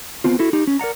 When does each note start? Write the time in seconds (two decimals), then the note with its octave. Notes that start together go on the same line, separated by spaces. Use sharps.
0.24 B3 C4 F4
0.39 E4 F#4 A4
0.53 D#4 G4
0.67 C#4
0.79 A#4 D5 F#5 A#5